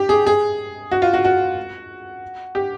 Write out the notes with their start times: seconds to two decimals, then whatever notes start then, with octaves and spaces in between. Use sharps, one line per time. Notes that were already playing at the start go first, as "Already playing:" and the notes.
Already playing: G4
0.09 G#4
0.27 G#4
0.91 F#4
1.02 F4
1.13 F#4
1.25 F#4
2.55 G4